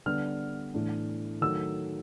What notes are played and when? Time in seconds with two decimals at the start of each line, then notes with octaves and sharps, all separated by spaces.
0.06 D3 G3 B3 D4 F6
0.74 A2 E3 A3 D4
1.41 D#3 F#3 A3 E6